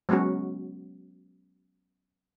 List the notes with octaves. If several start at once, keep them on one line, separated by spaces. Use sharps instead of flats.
F#3 G#3 B3 C#4 F#4